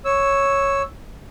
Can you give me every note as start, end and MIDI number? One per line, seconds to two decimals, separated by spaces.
0.05 0.82 73
0.05 0.82 88